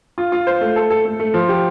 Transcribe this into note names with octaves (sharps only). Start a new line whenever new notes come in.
F4
F4
C5
A3
A4
A4
A3
A3
F3
G4